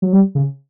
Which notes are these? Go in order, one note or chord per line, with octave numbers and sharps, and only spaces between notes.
F#3
G3
C#3